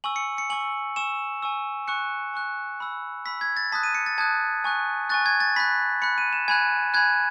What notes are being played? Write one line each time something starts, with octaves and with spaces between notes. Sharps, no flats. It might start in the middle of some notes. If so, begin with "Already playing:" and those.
G#5 C#6 E6 F#7
C#7
C#7
G#5 C#6 E6 F#7
G#5 C#6 E6 E7
G#5 C#6 E6
G#5 C#6 F#6 C#7
G#5 C#6 F#6
B5 E6
B5 E6 B6
G#6
A6
A5 D#6 F#6 B6
D#7
C#7
A6
A5 D#6 F#6 G#6
G#5 C#6 F#6
G#5 C#6 F#6 A6
G#6
A6
B5 F#6 B6
B5 F#6 C#7
D#7
E7
G#5 B5 F#6 G#6
G#5 B5 F#6 G#6